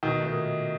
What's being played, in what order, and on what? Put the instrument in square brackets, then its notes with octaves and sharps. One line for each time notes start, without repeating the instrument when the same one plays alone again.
[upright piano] B2 B3 [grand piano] D#3
[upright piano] A3 [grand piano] D#4
[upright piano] A#2 A#3